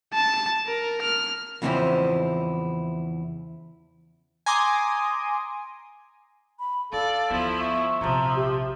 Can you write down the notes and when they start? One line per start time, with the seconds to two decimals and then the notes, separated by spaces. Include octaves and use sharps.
0.14 A5
0.67 A#4
1.02 F6
1.62 E2 C#3 F3 C4 C#4 E4
4.46 G#5 A#5 C6 D6 D#6
6.59 B5
6.93 E4 A4 D5 F5
7.30 D2 F3 B3 E4
7.59 E5 C#6
8.01 A#1 C3 F3 A#5
8.36 G4